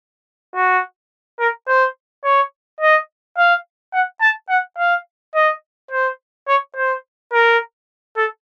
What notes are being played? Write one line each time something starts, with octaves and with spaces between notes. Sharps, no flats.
F#4
A#4
C5
C#5
D#5
F5
F#5
A5
F#5
F5
D#5
C5
C#5
C5
A#4
A4